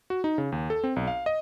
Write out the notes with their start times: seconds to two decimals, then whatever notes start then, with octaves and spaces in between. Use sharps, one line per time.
0.10 F#4
0.24 D#4
0.38 C#3
0.52 D#2
0.70 A4
0.84 C4
0.96 B1
1.07 F5
1.26 D#5